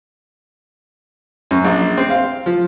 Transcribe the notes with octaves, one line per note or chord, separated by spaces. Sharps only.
F#2
A#1
C4
F5
F3